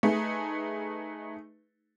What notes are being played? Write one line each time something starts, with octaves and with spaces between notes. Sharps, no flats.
A3 D#4 G#4 B4